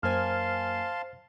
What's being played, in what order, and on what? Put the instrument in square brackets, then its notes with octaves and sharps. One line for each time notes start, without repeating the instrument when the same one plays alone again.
[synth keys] F#2 A#3 G#5 [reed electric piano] C5 F6 [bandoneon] F5 A5 C6